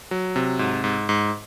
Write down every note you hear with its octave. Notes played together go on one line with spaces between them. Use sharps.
F#3
C3
G#2
G#2
G#2